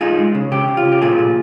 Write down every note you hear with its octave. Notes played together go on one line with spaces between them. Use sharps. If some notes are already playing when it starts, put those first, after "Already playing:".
D#4 F4 G#4
G#3
C#3
C#3 G4
C#3
F4
C#3
G4
A#2 F4 G#4
A#2